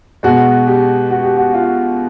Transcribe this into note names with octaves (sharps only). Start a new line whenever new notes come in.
B2 G#3 F#4
G4
F#4
G4
F#4
F4